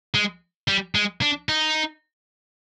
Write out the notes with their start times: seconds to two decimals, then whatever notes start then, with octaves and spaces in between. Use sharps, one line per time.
0.14 G#3
0.68 G3
0.95 G#3
1.22 D4
1.49 D#4